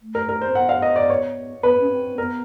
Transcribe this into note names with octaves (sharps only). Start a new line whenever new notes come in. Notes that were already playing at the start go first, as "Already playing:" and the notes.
A3
A#4
A#4
C5
C4
B3 F#5
F5
D#5
D5
C#5
B3 B4
C#4
C4
B3 A#4